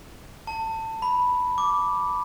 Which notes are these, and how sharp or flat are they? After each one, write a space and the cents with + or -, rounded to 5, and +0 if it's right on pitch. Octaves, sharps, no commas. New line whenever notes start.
A5 +25
B5 -5
D6 -5